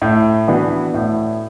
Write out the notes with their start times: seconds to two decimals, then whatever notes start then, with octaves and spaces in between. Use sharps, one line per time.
0.02 A2
0.48 E3 B3 D4 F#4
0.94 A2